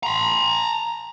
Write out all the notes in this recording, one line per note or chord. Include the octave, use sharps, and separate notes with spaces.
A#5 B5